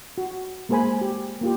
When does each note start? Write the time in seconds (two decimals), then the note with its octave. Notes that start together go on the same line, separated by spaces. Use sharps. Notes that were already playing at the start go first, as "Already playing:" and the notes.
0.18 F#4
0.69 G#3 A#3 G#4 C5 G#5 B5
1.01 G4
1.41 A#3 F4 G4